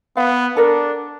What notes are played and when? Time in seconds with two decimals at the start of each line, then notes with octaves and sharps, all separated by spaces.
0.17 B3 F5
0.57 D4 A4 A#4